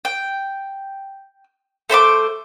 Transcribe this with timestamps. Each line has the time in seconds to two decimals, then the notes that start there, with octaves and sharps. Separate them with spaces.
0.05 G5
1.90 A3 C5 B5 D6